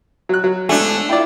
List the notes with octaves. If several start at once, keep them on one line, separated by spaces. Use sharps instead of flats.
F#3 F#6
F#3
G#2 D3 A3 D4 G#5
E4 F4 D5 G5